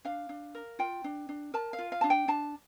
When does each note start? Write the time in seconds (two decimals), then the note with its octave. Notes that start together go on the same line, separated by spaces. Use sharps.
0.05 D4 F5
0.29 D4
0.55 A#4
0.79 F4 G5
1.04 D4
1.29 D4
1.54 A#4 A5
1.73 F5
1.79 F4
1.92 F5
2.01 D4 A5
2.10 G5
2.28 D4 A5